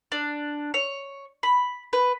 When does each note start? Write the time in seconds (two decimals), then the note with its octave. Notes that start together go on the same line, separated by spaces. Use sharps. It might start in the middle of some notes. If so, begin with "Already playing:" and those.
0.12 D4
0.74 C#5
1.43 B5
1.93 B4